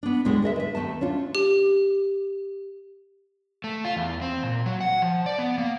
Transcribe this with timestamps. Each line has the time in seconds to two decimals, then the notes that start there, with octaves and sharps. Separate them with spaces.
0.03 B3 D4
0.25 D2 A2 G#3 G#4 G#5
0.42 G#4 A#4 D#5 E5
0.56 B4 E5
0.75 D#2 A3 B3 A5
1.01 C#4 D4 F4
1.35 G4
3.64 A3
3.85 F4
3.96 E2
4.22 C4
4.43 A#2
4.66 F#3
4.81 F#5
5.02 F3
5.26 D5
5.39 B3
5.58 A#3